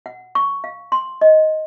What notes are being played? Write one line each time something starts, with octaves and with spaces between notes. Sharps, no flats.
F#5
C#6
F5
C6
D#5